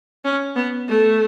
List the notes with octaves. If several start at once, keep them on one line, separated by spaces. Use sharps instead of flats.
C#4
B3
A3